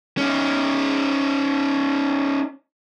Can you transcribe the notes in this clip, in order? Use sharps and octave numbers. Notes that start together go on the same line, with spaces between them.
C#4 D#4